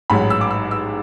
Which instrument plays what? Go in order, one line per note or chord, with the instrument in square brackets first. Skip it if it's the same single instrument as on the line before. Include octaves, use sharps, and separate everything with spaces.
[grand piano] A1 G#2 F#3 B5
E6
D6
E6
E6